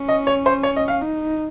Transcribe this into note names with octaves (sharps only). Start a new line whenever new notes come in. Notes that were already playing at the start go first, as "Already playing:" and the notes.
Already playing: C#4
D#5
C#5
C5
C#5
D#5
F5
D#4